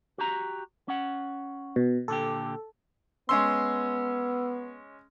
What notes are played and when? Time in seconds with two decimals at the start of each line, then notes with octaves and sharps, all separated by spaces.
0.18 F#4 G4 A#5
0.88 C#4 F#5
1.76 B2
2.08 A#2 D3 G4 A4
3.29 G#3 B3 C#4 C6 E6